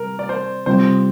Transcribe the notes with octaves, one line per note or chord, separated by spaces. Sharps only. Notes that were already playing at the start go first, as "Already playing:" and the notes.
Already playing: C3 G3 A#4
D5
C5
C3 G3 C4 F4 C5